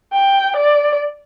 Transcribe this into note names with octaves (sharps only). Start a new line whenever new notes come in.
G5
D5